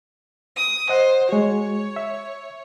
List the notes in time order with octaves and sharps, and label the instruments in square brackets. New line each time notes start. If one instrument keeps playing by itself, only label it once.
[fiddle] D#6
[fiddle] C5 [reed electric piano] D#5 F#5 D#6
[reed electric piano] G#3 F#4 [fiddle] C#5
[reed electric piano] E5